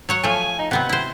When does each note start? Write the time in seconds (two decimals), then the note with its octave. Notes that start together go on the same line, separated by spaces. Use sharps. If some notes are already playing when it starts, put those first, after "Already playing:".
0.09 F#3 C#5 F#5
0.23 F3 A3 G#5
0.59 D#4
0.71 C3 B3 C4 F#5
0.89 E4 C5